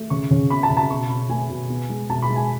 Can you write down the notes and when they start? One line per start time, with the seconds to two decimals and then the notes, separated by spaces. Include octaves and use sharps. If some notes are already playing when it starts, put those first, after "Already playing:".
Already playing: A3
0.10 C#3 C#6
0.31 C#3
0.50 B3 B5
0.63 A5
0.70 C#3
0.77 A5
0.90 B2 C#6
1.09 B2 B5
1.29 A3 G#5
1.49 B2
1.69 B3
1.89 G#3
2.10 B2 A5
2.22 B5
2.30 G#3
2.36 G#5